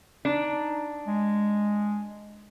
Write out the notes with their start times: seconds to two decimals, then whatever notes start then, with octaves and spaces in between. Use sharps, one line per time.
0.25 D4 D#4
1.08 G#3